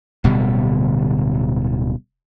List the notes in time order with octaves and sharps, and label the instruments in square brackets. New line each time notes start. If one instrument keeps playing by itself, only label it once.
[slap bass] D1 B2 D3 G3